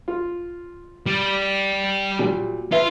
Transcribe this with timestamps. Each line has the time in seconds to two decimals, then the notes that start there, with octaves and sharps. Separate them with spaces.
0.08 F4
1.06 G3
2.19 A#2 F#3 G3
2.72 F4 B4 E5